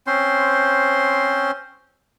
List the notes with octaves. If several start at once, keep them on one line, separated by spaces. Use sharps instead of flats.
C4 C#4 C5 C6